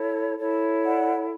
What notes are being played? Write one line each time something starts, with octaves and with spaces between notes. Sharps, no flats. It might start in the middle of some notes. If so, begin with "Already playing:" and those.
Already playing: E4 A4 C#5
E4 A4 C#5
D5 F#5